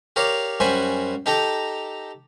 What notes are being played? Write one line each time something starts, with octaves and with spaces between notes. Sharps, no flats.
G4 A#4 C#5 D5 F5
F#2 G3 F#4 C5 G#5 B5
D#4 G4 A4 G5 A#5